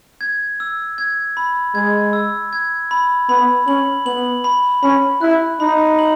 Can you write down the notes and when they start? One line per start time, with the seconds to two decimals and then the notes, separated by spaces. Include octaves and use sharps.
0.21 G#6
0.60 E6
0.98 G#6
1.37 B5
1.75 G#3 G#6
2.13 E6
2.53 G#6
2.91 B5
3.29 B3 B5
3.67 C#4 F#7
4.06 B3 F#7
4.44 B5
4.83 C#4 B5
5.21 E4 F#6
5.60 D#4 B5
5.99 F#7